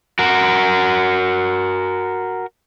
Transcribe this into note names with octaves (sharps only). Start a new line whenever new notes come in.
F#4 A#4